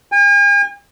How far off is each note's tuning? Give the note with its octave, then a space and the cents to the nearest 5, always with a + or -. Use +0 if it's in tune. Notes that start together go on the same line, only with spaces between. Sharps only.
G#5 -45